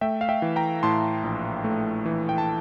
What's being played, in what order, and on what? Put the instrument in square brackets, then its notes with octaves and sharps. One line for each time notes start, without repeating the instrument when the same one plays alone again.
[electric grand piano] A3 E5 G5
F5
E5 G5
E3
G5 A#5
A2 A5 C6
A#1
A3
E3
G5
A5